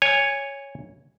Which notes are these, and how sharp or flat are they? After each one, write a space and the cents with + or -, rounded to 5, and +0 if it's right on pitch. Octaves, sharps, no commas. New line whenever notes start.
C#5 +0 G#5 -15